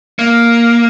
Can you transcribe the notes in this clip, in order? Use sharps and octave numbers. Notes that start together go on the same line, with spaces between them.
A#3